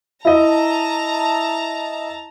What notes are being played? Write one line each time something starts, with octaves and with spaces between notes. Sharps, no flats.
E4 D#5 A5 A#5